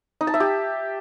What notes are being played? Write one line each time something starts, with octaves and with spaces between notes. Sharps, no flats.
D#4
A5
E5
G4